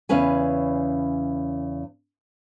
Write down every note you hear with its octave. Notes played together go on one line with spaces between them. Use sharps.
E2 C#3 C#4 B4 G#5